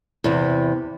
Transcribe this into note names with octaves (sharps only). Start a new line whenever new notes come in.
E2 C3